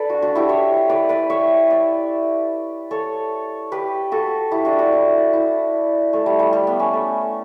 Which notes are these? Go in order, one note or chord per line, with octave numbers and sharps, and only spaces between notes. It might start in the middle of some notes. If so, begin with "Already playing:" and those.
Already playing: A4 B4 D5
D4 F#4
D4 F#4
E4 G4
C#5 E5
B4 D5
B4 D5
C#5 E5
B4 D5
A4 C#5
G4 B4
F#4 A4
E4 G4
D4 F#4
D4 F#4
E4
E4
A3
G3
G3
G3
B3
C#4
A3